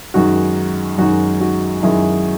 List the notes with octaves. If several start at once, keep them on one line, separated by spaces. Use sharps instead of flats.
F#2 D#3 G#3 D#4 F#4
F#2 D#3 G#3 D#4 F#4
D#4 F#4
F#2 D#3 G#3 E4 G#4